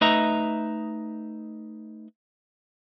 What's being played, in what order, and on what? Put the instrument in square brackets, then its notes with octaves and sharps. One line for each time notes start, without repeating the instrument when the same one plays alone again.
[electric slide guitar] A3 D#4 B4 D#5 E5 A#5